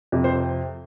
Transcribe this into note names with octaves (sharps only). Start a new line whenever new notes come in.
F2 C3
C5